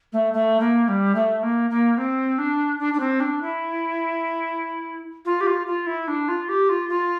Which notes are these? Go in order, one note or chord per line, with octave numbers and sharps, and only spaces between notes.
A3
A3
A#3
G3
A3
A#3
A#3
C4
D4
D4
D4
C4
D4
E4
F4
G4
F4
F4
E4
D4
F4
G4
F4
F4